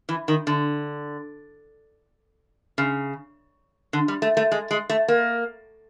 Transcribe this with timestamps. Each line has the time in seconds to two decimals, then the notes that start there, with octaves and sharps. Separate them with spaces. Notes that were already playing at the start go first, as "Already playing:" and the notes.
0.09 E3
0.28 D#3
0.47 D3
2.78 C#3
3.93 D3
4.08 G3
4.22 A3
4.37 A3
4.52 G#3
4.71 G#3
4.90 A3
5.08 A#3